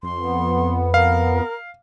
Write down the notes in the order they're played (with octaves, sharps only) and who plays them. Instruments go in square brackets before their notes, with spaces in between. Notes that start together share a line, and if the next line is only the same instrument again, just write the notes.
[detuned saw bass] F2 [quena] C6
[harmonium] B3
[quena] A#4 [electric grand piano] F5